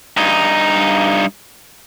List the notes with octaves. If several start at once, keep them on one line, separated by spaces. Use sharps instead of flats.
G2 D#4